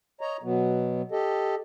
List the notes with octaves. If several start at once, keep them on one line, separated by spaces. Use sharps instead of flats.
C#5 D#5 A#5
B2 F#3 B3
G4 A4 D#5